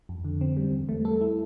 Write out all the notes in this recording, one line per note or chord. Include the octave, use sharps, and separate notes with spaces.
F2
D3
C4
G3
E2
A3
A4
E4